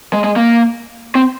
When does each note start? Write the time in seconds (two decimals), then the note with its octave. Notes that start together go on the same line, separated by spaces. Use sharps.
0.13 G#3
0.24 G#3
0.36 A#3
1.15 C4